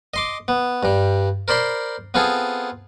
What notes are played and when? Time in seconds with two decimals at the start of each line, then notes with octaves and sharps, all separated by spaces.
0.14 D#5 C6 D6
0.48 B3
0.83 G2 G3
1.48 A#4 C5 D5 B5 C6
2.14 B3 C4 F4 G#4 A4